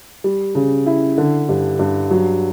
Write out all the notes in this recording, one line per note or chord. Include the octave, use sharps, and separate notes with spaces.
G3
C#3
E4
D3
G2
G2
F#3